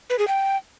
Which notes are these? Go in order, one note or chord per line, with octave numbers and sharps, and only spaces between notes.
B4
G#4
G5